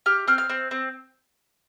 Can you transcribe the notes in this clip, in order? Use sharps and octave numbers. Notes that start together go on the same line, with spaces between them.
G4 F6
C4 F6
F6
C4
C4